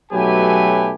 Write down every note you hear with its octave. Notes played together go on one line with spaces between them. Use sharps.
B1 F#3 A3 G4 B4 G#5